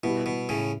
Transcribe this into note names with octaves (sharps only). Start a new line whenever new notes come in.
B2 G3 B3 E4
B2
A2 C#3